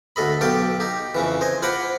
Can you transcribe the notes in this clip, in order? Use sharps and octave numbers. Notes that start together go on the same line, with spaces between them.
D2 A4 D#5 B5
B1 G4 A4 F5 G5
D#4 G4
F2 C#3 E3
C5 D#5 G#5
F4 C5 F#5 A#5 B5 D6